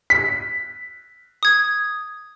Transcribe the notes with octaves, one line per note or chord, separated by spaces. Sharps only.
B6
D#6 G#6